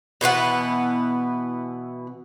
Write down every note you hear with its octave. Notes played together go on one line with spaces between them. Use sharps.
B2 E3 B3 F#5